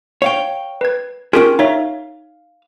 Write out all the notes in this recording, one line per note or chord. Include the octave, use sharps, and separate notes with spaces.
C#5 F5 G5
B4 G#6
C#4 F4 G4 G#4 A#4 D7
D#4 C#5 E5 F5